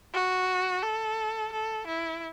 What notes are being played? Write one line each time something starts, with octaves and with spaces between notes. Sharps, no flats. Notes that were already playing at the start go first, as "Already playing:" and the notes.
F#4
A4
A4
E4